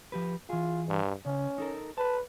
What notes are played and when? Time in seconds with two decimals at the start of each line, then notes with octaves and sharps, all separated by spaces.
0.12 F3 G4 B4
0.49 E3 F4 G#4
0.88 G2
1.26 C#3 C#4
1.58 D#4 A4 A#4
1.98 B4 A5